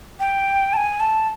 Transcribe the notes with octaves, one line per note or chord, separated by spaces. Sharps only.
G5
A5
G#5
A5